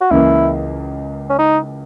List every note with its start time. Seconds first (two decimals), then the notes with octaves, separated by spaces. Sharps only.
0.01 F#4
0.11 C#2 C#3 E3 A#3 E4
1.30 C#4
1.39 D#4